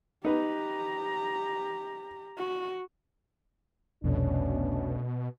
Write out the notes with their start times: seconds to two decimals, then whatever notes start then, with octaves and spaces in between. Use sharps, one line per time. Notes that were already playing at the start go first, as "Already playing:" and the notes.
0.25 D#4 G4 B4 A#5
2.37 F#4
4.04 F1 C2 F2 B2 A3 C#4 D4